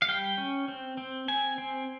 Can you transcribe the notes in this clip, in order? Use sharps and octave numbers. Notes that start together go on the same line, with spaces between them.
F5
G3 G5
C#4
C4
C4
C4 G#5
C4